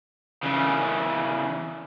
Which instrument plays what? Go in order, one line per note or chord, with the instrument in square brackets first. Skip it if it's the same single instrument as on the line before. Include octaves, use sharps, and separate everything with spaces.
[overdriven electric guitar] C#3 E3